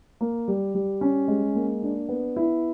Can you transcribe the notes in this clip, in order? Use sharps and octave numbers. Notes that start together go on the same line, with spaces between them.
A#3
G3
G3
C#4
G#3
A#3
D4
B3
E4